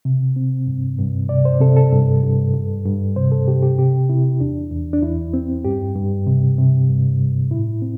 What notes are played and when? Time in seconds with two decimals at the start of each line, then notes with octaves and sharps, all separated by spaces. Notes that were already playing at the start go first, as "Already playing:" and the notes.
0.05 C3
0.36 C4
0.67 G2
0.99 G2
1.29 C3 D5
1.45 C5
1.61 C3 A4
1.77 A4
1.92 G2
2.23 G2
2.54 G2
2.85 G2
3.16 C3 C5
3.32 A4
3.47 C3 G4
3.63 G4
3.78 C3 G4
4.09 C3 E4
4.40 E2 D4
4.71 E2
4.93 D4
5.02 E2 E4
5.34 C4
5.65 G2 G4
5.96 G2
6.27 C3
6.58 C3
6.89 G2
7.20 G2
7.51 A2 E4
7.82 C4